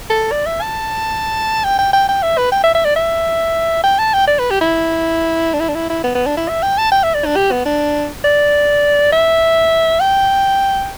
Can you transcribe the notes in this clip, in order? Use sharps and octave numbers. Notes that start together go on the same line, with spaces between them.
A4
D5
E5
A5
G5
G5
G5
G5
E5
B4
G5
E5
E5
D5
E5
G5
A5
G5
D5
B4
G4
E4
D4
E4
D4
E4
E4
B3
B3
D4
E4
E5
G5
A5
G5
E5
D5
D4
G4
B3
D4
D5
E5
G5